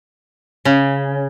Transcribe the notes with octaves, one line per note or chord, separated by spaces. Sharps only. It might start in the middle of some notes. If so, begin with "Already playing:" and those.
C#3